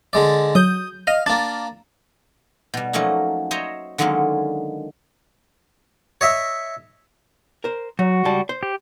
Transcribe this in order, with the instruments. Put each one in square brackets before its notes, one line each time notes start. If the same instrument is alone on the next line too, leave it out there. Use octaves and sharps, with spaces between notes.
[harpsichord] D3 G#3 D5
[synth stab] F#3 G6 [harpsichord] D#6
[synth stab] D#5 F6 [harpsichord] F5
[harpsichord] A#3 D4 [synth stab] A6
[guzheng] B2 G3
F3 F#3 A3 A#3 C#4 D#4
C5 C#5 D#5 E5 A#5
D3 D#3 F#3 G#3 A#3 C#4
[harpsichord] C#5 D#5 E5
[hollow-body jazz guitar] A#4 C5
[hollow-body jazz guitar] F#3 [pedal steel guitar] F#4
[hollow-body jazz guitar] C#2 G3 A5
C5
[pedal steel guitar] G4